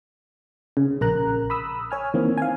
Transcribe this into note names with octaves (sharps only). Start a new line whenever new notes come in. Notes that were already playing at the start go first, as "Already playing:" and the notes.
C#3
A#1 A#4 A#5 F#6
B5 D#6 E6
C#5 G#5 F6
D#3 E3 A#3 C4
F5 G#5